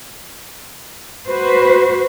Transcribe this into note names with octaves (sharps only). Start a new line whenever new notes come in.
F#4 B4 C5